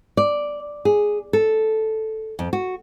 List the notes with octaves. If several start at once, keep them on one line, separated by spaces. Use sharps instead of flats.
D5
G#4
A4
F2
F#4